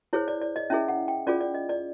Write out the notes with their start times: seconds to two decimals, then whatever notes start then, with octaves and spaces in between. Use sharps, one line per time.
0.13 E4 G#4 C5 C#5
0.28 D5
0.41 D5
0.56 D#5
0.70 C#4 E4 G#4 E5
0.88 F#5
1.08 G5
1.27 C#4 F4 G#4 D5
1.41 D5
1.54 D#5
1.69 D5